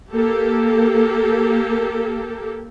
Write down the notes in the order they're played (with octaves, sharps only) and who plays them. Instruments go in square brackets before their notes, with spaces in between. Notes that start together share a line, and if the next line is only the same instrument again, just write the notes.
[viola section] A#3 G4 A4